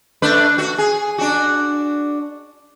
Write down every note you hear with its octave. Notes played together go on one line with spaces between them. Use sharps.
A3 D4 B4
F#4
G#4
D4 F#4